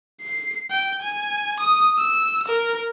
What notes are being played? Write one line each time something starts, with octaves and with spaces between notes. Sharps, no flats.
C7
G5
G#5
D#6
E6
A#4